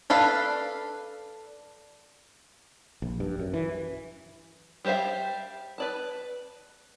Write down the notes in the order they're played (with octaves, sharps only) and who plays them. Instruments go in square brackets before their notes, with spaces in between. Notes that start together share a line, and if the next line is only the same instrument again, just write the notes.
[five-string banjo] D4 A4 B4 F5
[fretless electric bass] A#1
G2
F#2
E3
[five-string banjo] G3 G4 C5 E5 F5
B4 D5 A5